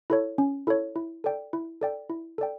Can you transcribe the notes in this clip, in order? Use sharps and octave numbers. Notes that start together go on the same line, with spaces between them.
E4 A4 C#5
C#4
E4 A4 C#5
E4
A4 D5 G5
E4
A4 D5 G5
E4
A4 D5 G5